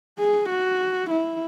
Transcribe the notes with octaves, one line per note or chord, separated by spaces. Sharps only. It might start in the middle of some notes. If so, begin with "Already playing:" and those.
G#4
F#4
E4